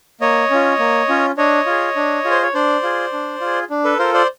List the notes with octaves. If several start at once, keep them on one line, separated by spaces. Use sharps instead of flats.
A#3 C#5 D#5
C#4 F4
A#3
C#4 F4
D4 C#5 D#5
F4 G#4
D4
F4 G#4
C5
C#5
D4 C5 D5
F4 G#4
D4
F4 G#4
D4
A4 B4
F4 A4 A#4 C5
C5 D5